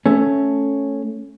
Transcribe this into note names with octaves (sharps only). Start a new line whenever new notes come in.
A3 C#4